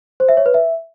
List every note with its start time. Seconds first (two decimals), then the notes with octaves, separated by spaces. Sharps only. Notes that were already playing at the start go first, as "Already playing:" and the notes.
0.20 C5
0.29 E5
0.37 C#5
0.46 B4
0.54 E5